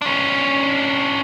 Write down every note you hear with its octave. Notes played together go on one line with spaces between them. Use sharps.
C#4 D4